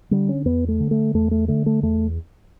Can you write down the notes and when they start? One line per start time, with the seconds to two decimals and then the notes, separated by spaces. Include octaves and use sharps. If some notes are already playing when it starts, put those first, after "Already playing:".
0.11 D3 G3
0.29 C#4
0.45 E2 B3
0.68 A3
0.80 D3
0.91 A3
1.14 E2 A3
1.31 A3
1.48 D3 A3
1.66 A3
1.83 E2 A3